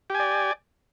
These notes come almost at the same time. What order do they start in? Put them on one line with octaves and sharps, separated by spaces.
G4 G#5 D5